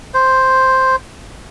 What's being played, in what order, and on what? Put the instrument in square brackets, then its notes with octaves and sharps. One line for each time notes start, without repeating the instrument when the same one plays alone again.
[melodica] C5